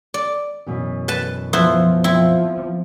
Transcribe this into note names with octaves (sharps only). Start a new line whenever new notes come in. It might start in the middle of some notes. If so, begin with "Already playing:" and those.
D5
F#2 B2 E3
B4 A5
F3 B3 E4 C5
F3 C4 E4